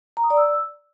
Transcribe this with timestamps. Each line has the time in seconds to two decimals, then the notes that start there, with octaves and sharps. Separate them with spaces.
0.17 A#5
0.24 D#6
0.30 D5
0.37 E6